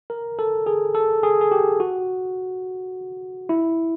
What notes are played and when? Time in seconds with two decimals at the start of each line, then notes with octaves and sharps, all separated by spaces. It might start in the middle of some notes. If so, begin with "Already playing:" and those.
0.10 A#4
0.39 A4
0.66 G#4
0.95 A4
1.23 G#4
1.41 G#4
1.51 G4
1.80 F#4
3.49 E4